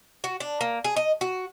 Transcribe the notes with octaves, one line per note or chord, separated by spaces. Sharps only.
F#4
D4
A#3
G#4
D#5
F#4